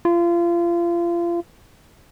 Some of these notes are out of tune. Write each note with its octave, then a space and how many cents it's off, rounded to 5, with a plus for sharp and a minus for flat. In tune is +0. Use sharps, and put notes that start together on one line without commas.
F4 -30